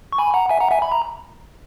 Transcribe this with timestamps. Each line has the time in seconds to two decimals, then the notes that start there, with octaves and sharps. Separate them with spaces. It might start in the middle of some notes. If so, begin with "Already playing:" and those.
0.13 C#6
0.18 G#5 B5
0.34 F#5 A#5
0.50 E5 G#5
0.60 F#5 A#5
0.71 E5 G#5
0.82 B5
0.92 A#5